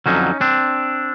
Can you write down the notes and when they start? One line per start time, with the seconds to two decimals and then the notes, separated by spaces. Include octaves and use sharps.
0.06 F2 D3 F#3 C#4 D#4
0.41 C4 D4